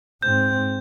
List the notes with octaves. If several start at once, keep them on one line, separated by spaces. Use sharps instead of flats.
G#2 C4 G6